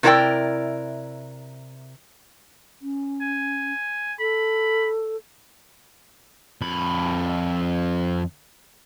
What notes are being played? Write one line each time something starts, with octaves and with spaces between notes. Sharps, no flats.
C3 E4 A#4 C#5 D5 G5
C#4
G#5
A4 B5
F2 B5